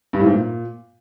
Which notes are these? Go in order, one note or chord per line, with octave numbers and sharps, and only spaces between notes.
G2
A2
G#2
A#2